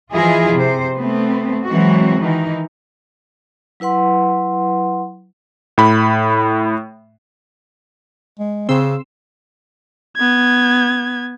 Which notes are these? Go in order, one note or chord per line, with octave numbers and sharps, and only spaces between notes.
E3 F3 E4 F4 G#4 D#5
C3 C5
A3 B3 C4
E3 F#3 G#3 C4 F#4
D#3 E3 D#4
F#3 E4 B4 F#5 C6
A2 B5
G#3
C#3 C4 C6 E6
B3 G#6